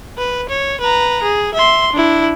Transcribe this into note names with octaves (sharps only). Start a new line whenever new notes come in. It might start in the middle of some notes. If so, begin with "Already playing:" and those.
B4
C#5
B4 A#5
G#4
E5 C6
D4 E4